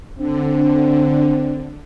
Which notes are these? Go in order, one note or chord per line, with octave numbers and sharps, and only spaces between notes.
D3 C4 D4